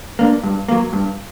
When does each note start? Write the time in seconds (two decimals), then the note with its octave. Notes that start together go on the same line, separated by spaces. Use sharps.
0.19 A#3 D4
0.43 G2
0.68 F#3 A#3
0.93 G2